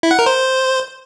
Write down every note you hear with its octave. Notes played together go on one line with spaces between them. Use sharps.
E4
F#5
A#4
C5